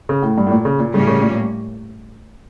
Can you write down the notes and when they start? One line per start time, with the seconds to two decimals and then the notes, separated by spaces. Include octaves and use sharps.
0.09 C#3
0.23 A2
0.38 G2
0.47 A2
0.51 A#2
0.65 C#3
0.79 A#2
0.93 A2 C#3 G3 A#3 C#4
1.07 C#3
1.22 A#2